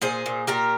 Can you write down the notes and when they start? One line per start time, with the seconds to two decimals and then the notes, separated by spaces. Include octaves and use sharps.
0.02 A#2 G#4 C5
0.26 A#2
0.47 A#2 G4 A#4